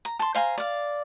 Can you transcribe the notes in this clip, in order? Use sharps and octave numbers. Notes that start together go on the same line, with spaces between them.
A#5
A5 C6
C5 F5 G#5 A#5
D5 F5